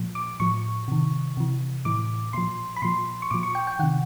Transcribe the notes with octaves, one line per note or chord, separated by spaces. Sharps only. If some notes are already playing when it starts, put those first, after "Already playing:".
Already playing: A#2 F3
D6
A2 F3 C#6
C3 D#3
C3 E3
A2 E3 D6
A#2 F3 C6
B5
A#2 F3 C6
C#6
A#2 F3 D6
C#6
G5
G5
C3 D#3 F#5